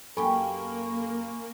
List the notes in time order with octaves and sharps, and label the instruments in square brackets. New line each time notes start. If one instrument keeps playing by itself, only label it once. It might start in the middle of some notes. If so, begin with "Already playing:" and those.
[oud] F#2 G4 [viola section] A#3 [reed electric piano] A4 [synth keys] G#5 B5 C#6